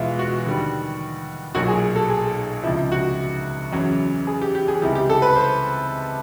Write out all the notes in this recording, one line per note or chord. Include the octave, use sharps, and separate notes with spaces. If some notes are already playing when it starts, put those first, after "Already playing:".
Already playing: E2 B2 G#3 E4 F4
F#4
D#2 D3 G3
B1 A#2 F#3 F#4
G#4
A4
G#4
C#2 C3 F3 E4
F#4
E2 C#3 F#3
G#4
G4
G4
G#4
C#2 C3 E3 G3 G4
G4
A4
B4
C5